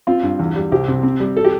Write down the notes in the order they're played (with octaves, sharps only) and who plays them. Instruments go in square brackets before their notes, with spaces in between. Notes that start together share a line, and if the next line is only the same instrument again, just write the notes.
[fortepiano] C4 F4
G2
E2
G3
C2 G4
C3
C4
G3
A4
G4